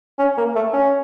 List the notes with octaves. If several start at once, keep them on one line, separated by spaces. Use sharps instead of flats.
C#4
A#3
A3
C#4